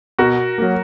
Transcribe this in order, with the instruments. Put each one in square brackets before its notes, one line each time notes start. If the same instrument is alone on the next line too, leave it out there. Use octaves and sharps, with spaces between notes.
[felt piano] B2 [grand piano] F#4 A#4
[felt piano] F#3 A#3